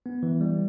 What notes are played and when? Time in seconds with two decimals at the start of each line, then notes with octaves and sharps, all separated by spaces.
0.06 B3
0.23 E3
0.41 G3